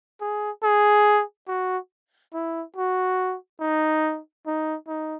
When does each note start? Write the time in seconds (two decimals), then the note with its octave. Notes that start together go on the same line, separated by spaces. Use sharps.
0.21 G#4
0.63 G#4
1.48 F#4
2.34 E4
2.76 F#4
3.60 D#4
4.46 D#4
4.88 D#4